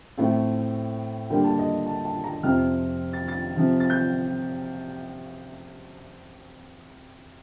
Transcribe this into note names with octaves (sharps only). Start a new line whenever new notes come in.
A2 A3 C4
D3 G3 A#3 G5
A5
D#5
A5
A5
A#5
F2 C3 F3 C4 F6
A6
A6
C3 F3 C4
A6
G6